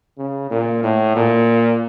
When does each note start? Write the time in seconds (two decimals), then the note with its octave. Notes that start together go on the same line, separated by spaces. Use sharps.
0.18 C#3
0.50 A#2
0.83 A2
1.16 A#2